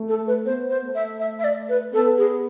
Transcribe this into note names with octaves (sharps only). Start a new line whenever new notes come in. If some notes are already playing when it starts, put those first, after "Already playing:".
Already playing: A3
A4
B4
B3 C5
C5
A3
E5
E5
E5
D5
B4
B3 A4
G#4